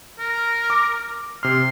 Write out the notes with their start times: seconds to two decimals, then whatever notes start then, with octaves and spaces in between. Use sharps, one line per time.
0.19 A#4
0.70 D6
1.43 C3 C6 F6